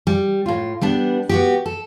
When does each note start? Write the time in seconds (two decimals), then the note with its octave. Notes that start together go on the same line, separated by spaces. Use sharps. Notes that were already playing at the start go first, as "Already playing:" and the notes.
0.07 G3
0.46 A2 F4
0.81 G3 B3 D4
1.29 B3 F#4 G4
1.66 A4